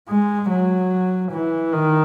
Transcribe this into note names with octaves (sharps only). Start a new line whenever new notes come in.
G#3
F#3
E3
D#3